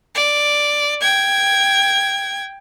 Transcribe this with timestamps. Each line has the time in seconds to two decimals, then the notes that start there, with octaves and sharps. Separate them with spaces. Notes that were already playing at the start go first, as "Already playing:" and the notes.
0.15 D5
1.01 G5 G#6